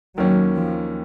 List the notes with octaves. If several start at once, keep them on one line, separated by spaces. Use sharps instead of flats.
D#2 D#3 F#3 A#3 C#4
F3